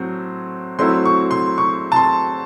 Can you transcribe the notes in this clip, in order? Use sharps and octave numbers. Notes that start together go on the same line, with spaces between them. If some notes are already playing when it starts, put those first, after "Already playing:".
Already playing: A2 F#3 C4
F#3 A3 C4 E4 C6
C#6
C6
C#6
A5
C6